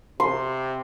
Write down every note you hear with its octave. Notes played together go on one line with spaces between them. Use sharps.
C3 C6